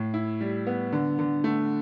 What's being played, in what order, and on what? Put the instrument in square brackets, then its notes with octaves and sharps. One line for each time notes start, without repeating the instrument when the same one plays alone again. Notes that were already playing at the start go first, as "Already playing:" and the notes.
Already playing: [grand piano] A2
E4
G3
B3
D3
D3
A3